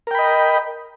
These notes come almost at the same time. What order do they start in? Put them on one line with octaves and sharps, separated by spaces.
A#4 G5 B5 D#5